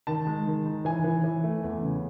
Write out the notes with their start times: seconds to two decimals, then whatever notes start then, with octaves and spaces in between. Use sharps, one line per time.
0.07 D#3 A5
0.27 G#3
0.47 D#3
0.66 D#4
0.85 E3 G#5
1.04 E3
1.24 E3
1.44 A3
1.64 E2
1.83 C#3